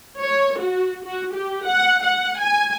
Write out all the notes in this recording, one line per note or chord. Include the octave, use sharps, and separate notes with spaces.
C#5
F#4
F#4
G4
F#5
F#5
G#5